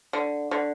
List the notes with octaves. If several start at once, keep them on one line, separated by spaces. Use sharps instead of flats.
D3
D3